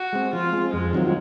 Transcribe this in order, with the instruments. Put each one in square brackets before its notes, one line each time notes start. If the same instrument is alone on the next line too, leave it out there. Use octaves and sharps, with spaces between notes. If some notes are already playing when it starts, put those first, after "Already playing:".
Already playing: [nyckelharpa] F#4
[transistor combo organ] G#3 C4
[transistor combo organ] F3 [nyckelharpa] F4
[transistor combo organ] G#3 C4
[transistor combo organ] F2 [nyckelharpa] G#3
[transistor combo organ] D#3 F#3 C4 F4